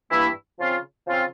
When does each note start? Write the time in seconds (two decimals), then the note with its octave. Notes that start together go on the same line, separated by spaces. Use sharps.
0.11 G2 E3 A#3 E4
0.58 C#3 F3 C4 F4
1.06 C#3 F3 C4 F4